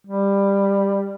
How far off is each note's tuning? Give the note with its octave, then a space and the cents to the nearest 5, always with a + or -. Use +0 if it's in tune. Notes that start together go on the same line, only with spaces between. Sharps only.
G3 +15